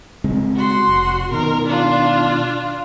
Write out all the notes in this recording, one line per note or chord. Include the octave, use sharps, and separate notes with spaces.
C#3 G#3 C4
F#4 C6
F1
B2 D#3 A#4
D4 F4